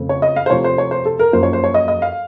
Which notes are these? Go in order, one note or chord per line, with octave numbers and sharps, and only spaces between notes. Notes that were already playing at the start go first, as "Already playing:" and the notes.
Already playing: F2 C#3 A3 C4
C#5
D#5
F5
C5
C3 F3 A3 C#5
C5
C#5
C5
A4
A#4
F#2 F3 A#3 C5
C#5
C5
C#5
D#5
D#5
F5